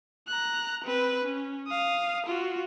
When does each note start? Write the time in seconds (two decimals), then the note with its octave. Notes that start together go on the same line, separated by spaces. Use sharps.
0.28 A#5 F#6
0.83 C4 B4
1.23 C#4
1.67 F5 D#6
2.25 F4 F#4